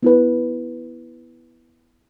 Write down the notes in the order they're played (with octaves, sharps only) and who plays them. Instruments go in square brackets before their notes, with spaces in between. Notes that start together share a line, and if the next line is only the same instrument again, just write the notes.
[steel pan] B3 E4 B4